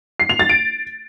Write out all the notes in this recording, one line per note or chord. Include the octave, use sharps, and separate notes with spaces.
C7
F7
A6
D7